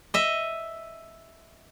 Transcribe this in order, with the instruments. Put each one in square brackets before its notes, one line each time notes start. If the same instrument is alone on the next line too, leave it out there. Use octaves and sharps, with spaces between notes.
[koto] D#5 E5